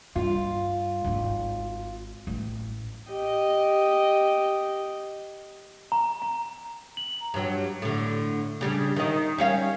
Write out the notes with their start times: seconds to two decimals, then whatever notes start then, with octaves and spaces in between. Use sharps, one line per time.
0.16 G2 F4
1.04 G#1 D#4
2.27 A1
3.09 G4 D#5
5.92 A#5
6.22 A#5
6.97 F#7
7.34 G2 F#3
7.82 A2 D3
8.61 C#3 G3 D4
8.96 D#3 D#5
9.38 G3 C#4 F5